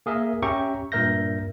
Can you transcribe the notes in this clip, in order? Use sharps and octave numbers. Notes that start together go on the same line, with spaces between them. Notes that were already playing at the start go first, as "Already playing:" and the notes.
A#3 G#4 A#4 E5
C#4 G4 E5 G5 A#5 C#6
G2 A#2 A#4 E5 G6 A#6